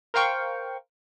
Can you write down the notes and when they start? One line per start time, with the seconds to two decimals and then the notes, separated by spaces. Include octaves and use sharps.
0.14 A#4 C5 F5 G5 C#6